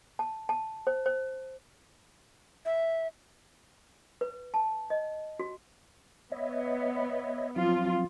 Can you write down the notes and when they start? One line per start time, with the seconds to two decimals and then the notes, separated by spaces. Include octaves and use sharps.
0.19 A5
0.49 A5
0.87 C5
1.06 C5
2.66 E5
4.21 B4
4.54 A5
4.90 D#5
5.39 F#4
6.32 B3 C#5 D#5 E5
7.56 F3 F#3 C4 F4